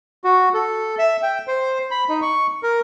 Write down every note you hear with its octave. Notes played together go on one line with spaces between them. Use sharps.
F#4
A4
E5
G5
C5
B5
D#4
C#6
A#4